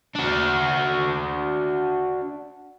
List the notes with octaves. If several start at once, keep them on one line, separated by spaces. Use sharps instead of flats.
D4 F#4